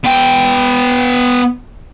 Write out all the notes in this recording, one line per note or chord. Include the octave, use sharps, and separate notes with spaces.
B3 G5